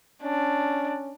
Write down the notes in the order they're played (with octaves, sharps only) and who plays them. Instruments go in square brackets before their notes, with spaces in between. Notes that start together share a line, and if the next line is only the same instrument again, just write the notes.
[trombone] C#4 [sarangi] D4